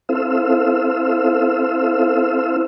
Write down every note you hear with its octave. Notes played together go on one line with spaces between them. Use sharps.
C4 E4 A4 C5 F5 E6